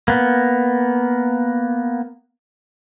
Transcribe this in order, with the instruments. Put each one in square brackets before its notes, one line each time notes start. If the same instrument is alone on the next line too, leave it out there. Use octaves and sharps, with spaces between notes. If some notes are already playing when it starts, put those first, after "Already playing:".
[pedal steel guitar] A#3 B3